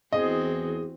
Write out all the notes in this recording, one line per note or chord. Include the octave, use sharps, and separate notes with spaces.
E2 E3 C4 F#4 G#4 D#5